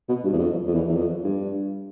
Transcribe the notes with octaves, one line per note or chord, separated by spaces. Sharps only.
B2
G2
E2
F2
F2
E2
E2
F2
G2